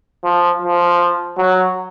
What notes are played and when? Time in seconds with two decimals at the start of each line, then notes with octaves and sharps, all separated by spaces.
0.24 F3
0.62 F3
1.37 F#3